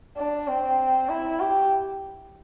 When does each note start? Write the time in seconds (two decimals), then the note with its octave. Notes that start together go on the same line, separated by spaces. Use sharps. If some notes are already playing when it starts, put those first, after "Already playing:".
0.17 D4
0.47 C4
1.09 E4
1.40 G4